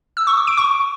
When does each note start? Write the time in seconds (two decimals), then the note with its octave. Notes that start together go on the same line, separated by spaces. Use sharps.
0.17 E6
0.27 C#6
0.37 D6
0.47 D7
0.57 C#6